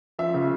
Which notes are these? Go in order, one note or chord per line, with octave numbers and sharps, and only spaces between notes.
F3 E5
C#3